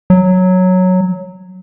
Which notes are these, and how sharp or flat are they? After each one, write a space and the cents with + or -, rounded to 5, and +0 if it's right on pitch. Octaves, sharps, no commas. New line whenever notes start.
F#3 -5